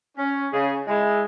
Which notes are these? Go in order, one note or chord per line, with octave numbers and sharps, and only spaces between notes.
C#4
C#3 G#4
G#3 E4